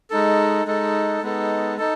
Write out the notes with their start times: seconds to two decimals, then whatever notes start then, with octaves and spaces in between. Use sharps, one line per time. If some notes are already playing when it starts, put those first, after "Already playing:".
0.10 G#3 D#4 A4
0.66 G#3 D#4 A4
1.22 G#3 B3 D#4 A4
1.78 D#4 A4